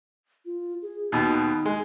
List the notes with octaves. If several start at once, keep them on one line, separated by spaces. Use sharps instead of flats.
F4
G#4
D#2 B2 D#4
G#3